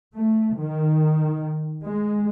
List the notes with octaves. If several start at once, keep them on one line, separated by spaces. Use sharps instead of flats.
A3
D#3
G#3